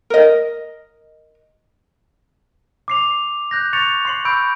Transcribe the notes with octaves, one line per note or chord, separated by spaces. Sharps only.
A#4 D#5
D6 C7 F7
F#6 G6 A#6
C#6 A6 C#7 F7
C6 C7 F#7
B5 C#6 E6 G6 D7